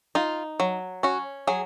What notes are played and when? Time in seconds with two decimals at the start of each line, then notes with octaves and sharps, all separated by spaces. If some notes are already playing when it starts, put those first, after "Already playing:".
0.15 D#4 F4
0.60 F#3
1.03 C#4 F#4
1.47 F#3 G#4